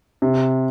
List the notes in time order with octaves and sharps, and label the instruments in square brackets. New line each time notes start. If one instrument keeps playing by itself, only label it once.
[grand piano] C3